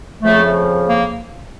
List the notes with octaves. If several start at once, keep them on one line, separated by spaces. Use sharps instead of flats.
F2 C#3 F3 A3
A#3